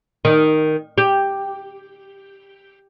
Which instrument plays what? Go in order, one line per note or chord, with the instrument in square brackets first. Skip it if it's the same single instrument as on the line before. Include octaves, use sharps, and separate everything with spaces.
[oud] D#3
G4